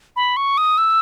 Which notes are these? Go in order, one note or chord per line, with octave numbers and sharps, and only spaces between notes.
B5
C#6
D#6
E6